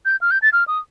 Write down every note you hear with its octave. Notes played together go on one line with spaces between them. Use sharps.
G6
F6
G6
A6
F6
D#6